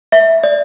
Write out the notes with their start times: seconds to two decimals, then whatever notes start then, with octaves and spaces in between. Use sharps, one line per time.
0.12 E5
0.44 D5